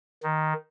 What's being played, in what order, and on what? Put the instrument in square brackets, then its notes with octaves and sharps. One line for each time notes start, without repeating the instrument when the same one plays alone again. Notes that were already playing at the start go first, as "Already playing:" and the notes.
[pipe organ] D#3